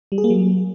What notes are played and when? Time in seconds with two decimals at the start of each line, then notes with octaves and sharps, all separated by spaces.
0.12 G3
0.18 G#4
0.24 A#3
0.30 F#3